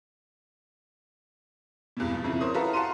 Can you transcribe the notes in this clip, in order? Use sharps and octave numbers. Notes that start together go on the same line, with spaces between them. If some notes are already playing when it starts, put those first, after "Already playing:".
E2 G2 B2
B2 F3
G1 F2 C#3 E4
A#4 C5 C#5 D#6
E4 F#4 A4 B4 F5 A#5
F5 F#5 A5 A#5 C6 D#7